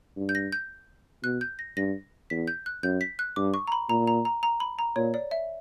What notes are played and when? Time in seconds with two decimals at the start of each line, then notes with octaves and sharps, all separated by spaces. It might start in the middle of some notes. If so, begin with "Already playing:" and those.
0.17 G2
0.29 G6
0.35 A#6
0.52 G6
1.23 B2 F#6
1.41 G6
1.59 A#6
1.77 G2 A#6
2.30 E2 B6
2.48 G6
2.66 F#6
2.83 F#2 G6
3.01 B6
3.19 F#6
3.36 G2 D6
3.54 C#6
3.68 A#5
3.72 B5
3.89 A#2 A#5
4.07 A#5
4.25 A#5
4.43 A#5
4.60 B5
4.79 A#5
4.96 A#2 C#5
5.14 D5
5.31 E5